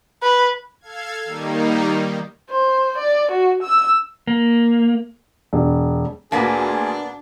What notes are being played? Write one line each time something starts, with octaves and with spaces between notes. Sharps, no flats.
B4
A4 F5 G#6
D#3 G3 A#3 D#4
C5
D5
F#4
E6
A#3
E1
D2 A#2 A#3 B3 D4 G#4 G#5